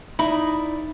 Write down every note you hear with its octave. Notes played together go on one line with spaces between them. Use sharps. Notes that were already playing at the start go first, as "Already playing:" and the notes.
D#4 E4 D5 B5